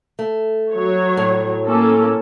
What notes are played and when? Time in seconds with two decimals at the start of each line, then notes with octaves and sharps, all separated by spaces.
0.19 A3
0.72 F#3 C#5
1.17 A2
1.65 A#3 C#4 A4